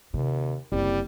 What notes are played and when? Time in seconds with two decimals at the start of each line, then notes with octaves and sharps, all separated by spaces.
0.14 D#2 C3
0.72 F#1 C2 G3